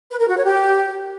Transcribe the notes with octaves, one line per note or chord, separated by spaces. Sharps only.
B4
A#4
F#4
C#5
G4